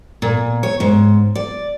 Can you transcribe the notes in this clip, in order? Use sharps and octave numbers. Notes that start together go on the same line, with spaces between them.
A#2
C#5
G#2
D5